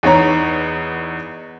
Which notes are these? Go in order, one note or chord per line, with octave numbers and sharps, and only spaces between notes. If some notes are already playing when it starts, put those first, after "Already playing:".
E2 B3 D#4 C#5 A#5